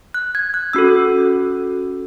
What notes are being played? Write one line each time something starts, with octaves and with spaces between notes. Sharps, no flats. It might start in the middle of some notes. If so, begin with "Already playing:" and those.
F#6
G#6
F#6
C#4 F#4 A4 E6